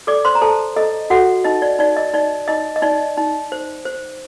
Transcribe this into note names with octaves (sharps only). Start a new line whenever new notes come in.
A4 D5 D6
C5 C6
A#5
A4 C5 A5
A4 D#5
F#4 A4 F#5
D#4 D#5
D5
D#4 D5
D#5
D#4 D5
D#4 D#5
D#5
D#4 D5
D#4
C5
C5